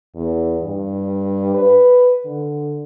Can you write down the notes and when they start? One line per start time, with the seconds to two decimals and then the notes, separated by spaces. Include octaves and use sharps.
0.15 E2
0.62 G2
1.54 B4
2.25 D3